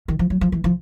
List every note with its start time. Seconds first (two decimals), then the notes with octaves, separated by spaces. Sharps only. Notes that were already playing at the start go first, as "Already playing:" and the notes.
0.08 D#3
0.19 F3
0.30 F#3
0.41 F3
0.52 E3
0.64 F3